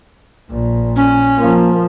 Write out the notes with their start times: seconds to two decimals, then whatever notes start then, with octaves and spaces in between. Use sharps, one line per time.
0.50 A#1 A#2
0.96 C#4
1.39 F3 A#3